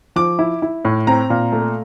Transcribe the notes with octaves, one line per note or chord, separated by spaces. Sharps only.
F3 D6
E4
E4
A2
C4 A#5
A#2
A3